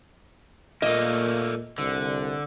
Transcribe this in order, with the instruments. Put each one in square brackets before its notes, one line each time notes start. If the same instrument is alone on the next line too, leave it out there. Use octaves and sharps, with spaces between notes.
[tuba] A#2 [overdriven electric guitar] A3 A#3 [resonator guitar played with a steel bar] D#5
[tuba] C2 [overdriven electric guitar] D3